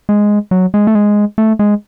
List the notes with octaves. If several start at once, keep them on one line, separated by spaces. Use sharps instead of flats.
G#3
F#3
G#3
A3
G#3
A3
G#3